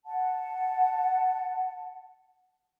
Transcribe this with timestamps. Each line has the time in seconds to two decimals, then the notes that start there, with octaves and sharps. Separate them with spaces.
0.05 F#5 A5